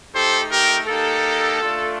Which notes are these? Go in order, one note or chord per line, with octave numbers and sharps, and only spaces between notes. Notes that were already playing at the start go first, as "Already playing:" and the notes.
A3 D#4 G4 A4 C5
G4 A#4
A#3 D#4 G4 A4
A3 D4 F4